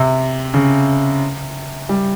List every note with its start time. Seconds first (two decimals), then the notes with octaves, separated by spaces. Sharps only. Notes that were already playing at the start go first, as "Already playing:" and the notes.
Already playing: C3
0.54 C#3
1.89 G3